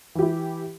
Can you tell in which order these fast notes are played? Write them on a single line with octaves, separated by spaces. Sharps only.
E3 G4 E4